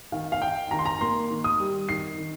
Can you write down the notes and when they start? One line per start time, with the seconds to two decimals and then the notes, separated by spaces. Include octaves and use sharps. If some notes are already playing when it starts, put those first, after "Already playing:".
0.12 D#3 F5
0.32 F5
0.42 D#3 G5
0.71 D#3 A#5
0.79 C6
0.85 A#5
1.01 A#3 C6
1.31 D#3
1.44 D#6
1.59 G3
1.89 D#3 C7
2.18 D#3